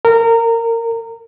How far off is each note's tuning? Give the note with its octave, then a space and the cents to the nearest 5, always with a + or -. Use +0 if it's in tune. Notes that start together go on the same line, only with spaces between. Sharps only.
A#4 -20